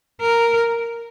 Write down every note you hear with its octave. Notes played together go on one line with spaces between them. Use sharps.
A#4